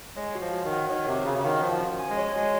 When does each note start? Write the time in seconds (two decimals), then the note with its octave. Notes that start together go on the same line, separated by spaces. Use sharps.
0.16 G#3 C#5
0.35 F#4
0.41 F3
0.53 F#4
0.64 D#3
0.71 F#5
0.89 D#3 C#5
1.07 C3 F#4
1.25 C#3 F#4
1.38 C#3
1.44 D#3 F#5
1.62 F3 F#4
1.80 C#4
1.99 G#5
2.10 G#3
2.17 C#5
2.36 G#3 F#4